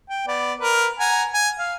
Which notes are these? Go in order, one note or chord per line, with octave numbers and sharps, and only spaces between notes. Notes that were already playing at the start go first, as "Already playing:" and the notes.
G5
B3 D5
A#4 B4
F#5 G#5 A#5
G#5
F5